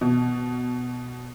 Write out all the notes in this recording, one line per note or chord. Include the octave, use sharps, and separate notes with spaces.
B2